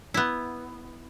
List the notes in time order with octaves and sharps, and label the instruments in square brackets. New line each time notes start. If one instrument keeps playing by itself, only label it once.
[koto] B3 E4